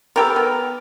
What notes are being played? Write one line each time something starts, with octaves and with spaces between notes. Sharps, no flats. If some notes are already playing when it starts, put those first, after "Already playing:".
B3 G4 A4 A#4
B3